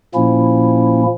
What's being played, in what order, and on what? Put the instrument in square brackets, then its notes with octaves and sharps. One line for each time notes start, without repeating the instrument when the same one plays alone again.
[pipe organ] A#2 F3 A#3 C#4 E4